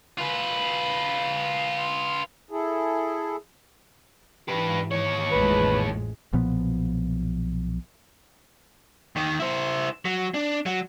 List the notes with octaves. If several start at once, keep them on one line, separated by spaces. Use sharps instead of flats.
F4 B4
E4 G#4 A4
G#2 E3 G4 B4
D#2 C#5
A1 F2 G#3 B4
B1 A#2 F3 B3
D#2 D#3
E4 C5
F#3
D4
F#3